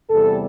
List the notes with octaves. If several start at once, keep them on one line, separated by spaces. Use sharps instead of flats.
E2 C3 G3 A4